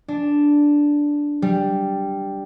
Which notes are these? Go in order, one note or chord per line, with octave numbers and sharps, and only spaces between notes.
D4
G3